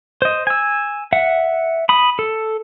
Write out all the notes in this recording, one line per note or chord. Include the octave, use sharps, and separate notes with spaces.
C5 D#5
G#5 E6
E5 F#5
B5 D#6
A4